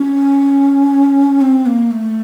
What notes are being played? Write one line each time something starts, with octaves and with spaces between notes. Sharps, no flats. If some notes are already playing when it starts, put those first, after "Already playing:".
Already playing: C#4
C4
A#3
A3